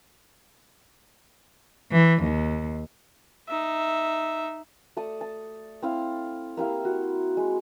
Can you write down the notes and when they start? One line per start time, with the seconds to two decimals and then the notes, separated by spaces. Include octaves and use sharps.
1.92 E3
2.23 D#2
3.48 D#4 E5
4.97 A3 D5 A5 D#6
5.21 A5
5.82 C4 E4 F5
6.57 A#3 E4 G4 F5
6.85 F#4
7.37 G#3